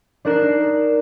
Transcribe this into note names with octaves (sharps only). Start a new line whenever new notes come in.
D4 D#4 A#4 F#6 C7 E7